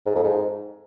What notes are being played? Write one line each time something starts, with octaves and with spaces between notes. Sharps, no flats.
G#2
F2
G#2